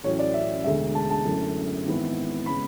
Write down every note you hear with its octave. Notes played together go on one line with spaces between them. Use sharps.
A1 A2 F#3 C#4 C#5
D5
E5
E1 D2 D3 G#3 E5
A5
A5
F#2 D3 A3 E4
G#1 G#2 E3 B3 E4
C#3 G#3 B3 B5